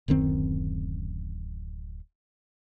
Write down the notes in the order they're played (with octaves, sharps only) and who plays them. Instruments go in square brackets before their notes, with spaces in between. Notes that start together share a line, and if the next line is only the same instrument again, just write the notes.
[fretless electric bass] D1 F#2 D#3 C4